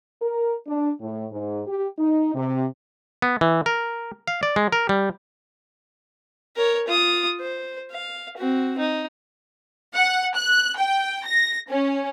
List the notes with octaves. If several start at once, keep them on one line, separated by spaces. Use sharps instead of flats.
A#4
D4
A2
G#2
G4
D#4
C3
B3
E3
A#4
F5
D5
G#3
A#4
G3
A#4 C#5
F4 D#6
C5
F5
C4 F#4
D#4
F#5
F#6
G5
A#6
C#4